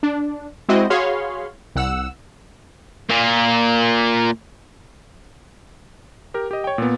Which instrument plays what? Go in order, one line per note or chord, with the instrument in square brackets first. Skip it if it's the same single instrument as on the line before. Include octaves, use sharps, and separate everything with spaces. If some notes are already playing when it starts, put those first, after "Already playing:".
[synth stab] D4
G#3 C4 E4 F#4 D#5
F#4 G#4 C#5 F5 B5 C6
C2 F#5 E6
[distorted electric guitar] A#2 A#3
[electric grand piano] G4 A#4
G4 D#5
C#5 G5
A#2 B3